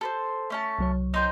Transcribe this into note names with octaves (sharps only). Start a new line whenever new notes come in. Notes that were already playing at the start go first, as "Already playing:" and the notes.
A4 B4 C5
A3 C#4 A5
C2 F#3 C#5
D#4 C5 G5